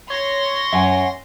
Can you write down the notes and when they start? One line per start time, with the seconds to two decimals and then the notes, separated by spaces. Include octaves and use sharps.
0.10 C#5 C6 A#6
0.73 F#2 E5 F#5 G#5